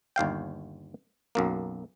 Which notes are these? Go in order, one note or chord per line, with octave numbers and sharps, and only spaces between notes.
G1 D#2 F5 G5
B1 F#2 A#3